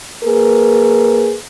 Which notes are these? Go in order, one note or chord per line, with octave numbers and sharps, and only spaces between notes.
A#3 G#4 A#4 B4